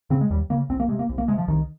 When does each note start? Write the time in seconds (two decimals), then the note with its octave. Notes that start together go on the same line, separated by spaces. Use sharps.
0.10 C#3 C4
0.21 G#3
0.30 D#2 G3
0.50 C#3 A#3
0.69 C2 C4
0.80 A#3
0.88 C3 G#3
0.99 A#3
1.09 C2
1.18 A#3
1.28 C3 G#3
1.38 F3
1.48 C2 D#3